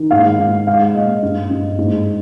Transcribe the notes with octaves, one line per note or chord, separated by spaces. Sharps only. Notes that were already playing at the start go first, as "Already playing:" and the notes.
Already playing: D#3
G#2 F5
G#2
G#3 F5
A#2 D#5
G2
G2
G#2